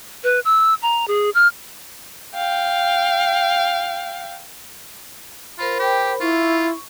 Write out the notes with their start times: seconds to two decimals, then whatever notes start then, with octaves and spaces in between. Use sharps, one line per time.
0.24 B4
0.45 E6
0.82 A#5
1.08 G#4
1.35 F6
2.35 F5 G5
5.59 F4 A#4 C5 B5
5.79 G4 G5
6.21 E4 F4 C#6